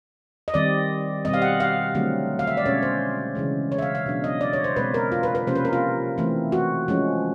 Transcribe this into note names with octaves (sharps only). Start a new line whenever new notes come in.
D#5
D#3 G3 C4 D5
B2 G3 C4 D#5
F5
F#5
F5
D3 F#3 A3 C4
F5
E5
D5
B2 G#3 C#4 C#5
C5
C#3 E3 G#3
C#5
E5
F5
F5
B2 F#3 B3 D4
D#5
D5
C#5
C5
B2 G#3 C4 B4
A#4
F4
B4
B4
C3 F3 A#3 C#4 C5
B4
A#4
F4
E3 A3 C4
F#4
F3 G#3 C#4